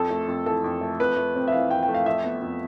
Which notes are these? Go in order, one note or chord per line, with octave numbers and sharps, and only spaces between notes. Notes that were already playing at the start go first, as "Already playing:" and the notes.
Already playing: F2 A4
A3
F2
E3 A4
F2
A3
F2 B4
A3
C4
E5
E3 F5
F2 G5
G5
A3
F5
F2 E5
B3
F2